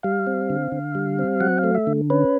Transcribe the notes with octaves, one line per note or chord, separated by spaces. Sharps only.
G3 F5
C4
D3
D3
G3
C4
F#3 F#5
F5
A3
E5
D3
C#4 B4